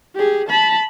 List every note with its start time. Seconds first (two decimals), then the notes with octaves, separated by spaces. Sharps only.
0.15 G4 G#4
0.48 A5 B5